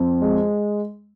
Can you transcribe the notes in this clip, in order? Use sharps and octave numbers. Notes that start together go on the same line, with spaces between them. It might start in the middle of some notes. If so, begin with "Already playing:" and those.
Already playing: F2
G#3